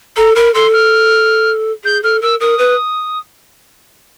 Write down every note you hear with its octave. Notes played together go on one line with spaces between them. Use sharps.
A4 A#5
A#4 B5
A4 C6
F6
G#4 G6
A4 F6
A#4 E6
A#4 D#6
B4